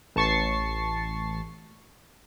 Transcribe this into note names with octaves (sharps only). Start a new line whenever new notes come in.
A1 A5 C#6 A6 C7